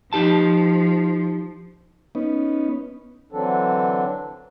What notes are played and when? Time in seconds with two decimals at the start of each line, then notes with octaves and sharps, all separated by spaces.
0.13 F3 D#4 G4 A5
2.15 B3 C#4 D#4
3.32 D3 E3 F#3 C4 D4 A4